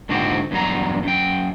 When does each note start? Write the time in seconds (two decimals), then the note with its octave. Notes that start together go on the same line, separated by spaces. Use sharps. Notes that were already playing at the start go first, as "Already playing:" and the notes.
0.09 G#2 D3 F3 C4 F#4 G4
0.51 E2 G2 F#3 A#5
1.03 F#2 G5